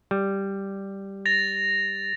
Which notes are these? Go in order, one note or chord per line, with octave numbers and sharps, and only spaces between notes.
G3
A6 A#6 F7